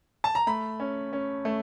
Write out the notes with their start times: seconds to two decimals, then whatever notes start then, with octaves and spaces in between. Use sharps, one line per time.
0.24 A5
0.35 A#5
0.47 A3 B5
0.80 C#4
1.13 C#4
1.45 A3